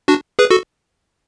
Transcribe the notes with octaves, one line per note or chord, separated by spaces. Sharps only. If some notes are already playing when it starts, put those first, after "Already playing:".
D4 F#4
G#4 B4
F#4 A4